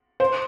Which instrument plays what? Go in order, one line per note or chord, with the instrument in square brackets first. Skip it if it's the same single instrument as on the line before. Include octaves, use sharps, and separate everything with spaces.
[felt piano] C5